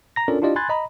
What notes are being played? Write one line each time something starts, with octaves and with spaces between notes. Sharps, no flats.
A#5 A#6
C#4 D4 F4 A4 A#4 D5
D4 E4 F4 G4 D5 D#5
G#5 B5 C6 F#6 G#6 A6
D#5 A#5 B5